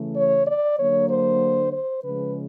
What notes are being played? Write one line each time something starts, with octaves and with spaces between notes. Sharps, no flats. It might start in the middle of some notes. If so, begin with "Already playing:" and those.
Already playing: C#3 E3 A3
C#5
D5
D3 F#3 A#3 C#5
C5
C5
C#3 F3 G#3 B4